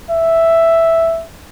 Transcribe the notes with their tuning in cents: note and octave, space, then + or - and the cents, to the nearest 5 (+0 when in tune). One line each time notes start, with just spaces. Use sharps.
E5 +0